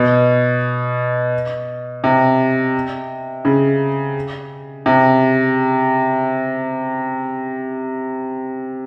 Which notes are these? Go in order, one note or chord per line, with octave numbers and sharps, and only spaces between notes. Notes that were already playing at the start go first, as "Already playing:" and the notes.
Already playing: B2
C3
C#3
C3